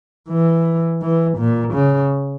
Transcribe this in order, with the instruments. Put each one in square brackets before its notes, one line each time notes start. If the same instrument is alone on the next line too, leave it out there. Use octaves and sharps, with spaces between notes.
[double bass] E3
E3
A#2
C#3